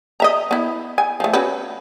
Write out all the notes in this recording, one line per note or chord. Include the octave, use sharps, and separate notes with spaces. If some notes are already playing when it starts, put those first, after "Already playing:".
D#5 E5 A#5
B3 E4
G#5
F3 A3
C#4 F#4 B4